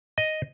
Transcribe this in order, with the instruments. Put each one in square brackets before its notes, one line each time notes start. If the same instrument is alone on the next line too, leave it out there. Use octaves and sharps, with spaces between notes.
[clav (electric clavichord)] D#5